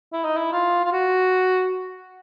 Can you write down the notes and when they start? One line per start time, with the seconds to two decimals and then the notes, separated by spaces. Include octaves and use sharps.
0.13 E4
0.24 D#4
0.36 E4
0.52 F4
0.84 F4
0.92 F#4